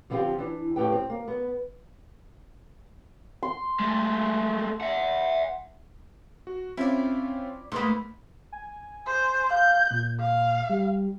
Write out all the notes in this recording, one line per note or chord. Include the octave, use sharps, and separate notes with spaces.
D3 F3 B3 C4 F4 G4
E3 D4
F2 A2 A3 G4 B4 G5
C4
A#3
B3
C6
G#3 A3
E5 F#5
F#4
C4 C#4 E4 F4 D5
G#2 A3 A#3 B4 B5 C6 D#6
G#5
C5
F5 G6
A#2
F5
G3